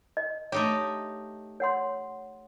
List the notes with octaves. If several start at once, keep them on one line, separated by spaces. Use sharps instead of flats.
D#5
A3 D#4 G4 C#5
C#5 F#5 C6